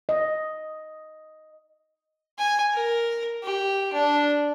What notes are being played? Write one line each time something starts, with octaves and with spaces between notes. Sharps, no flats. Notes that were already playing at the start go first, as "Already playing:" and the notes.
D#5
G#5
A#4
G4
D4